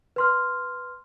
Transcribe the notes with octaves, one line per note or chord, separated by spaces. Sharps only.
B4 C6 F6